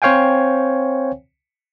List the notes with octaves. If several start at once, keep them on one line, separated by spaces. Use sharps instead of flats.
C4 C5 C#5 F5 G5 G#5